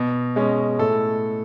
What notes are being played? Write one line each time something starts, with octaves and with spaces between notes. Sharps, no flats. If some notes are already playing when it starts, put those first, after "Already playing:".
Already playing: B2
G#3 C#4
A2 A4